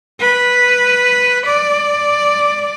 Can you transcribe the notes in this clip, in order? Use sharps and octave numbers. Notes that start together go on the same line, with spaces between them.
B4
D5